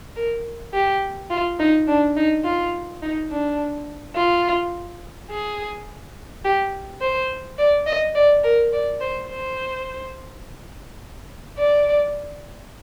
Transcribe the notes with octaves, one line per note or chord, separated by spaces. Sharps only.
A#4
G4
F4
D#4
D4
D#4
F4
D#4
D4
F4
G#4
G4
C5
D5
D#5
D5
A#4
D5
C5
C5
D5